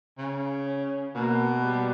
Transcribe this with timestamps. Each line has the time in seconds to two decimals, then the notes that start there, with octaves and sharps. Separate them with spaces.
0.18 C#3
0.67 C#4
1.15 B2 A#3
1.63 G3